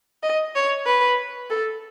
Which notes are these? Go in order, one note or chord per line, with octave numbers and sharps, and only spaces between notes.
D#5
C#5
B4
A4